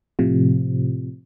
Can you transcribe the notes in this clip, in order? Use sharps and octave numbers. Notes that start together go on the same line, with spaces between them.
A2 C3 F3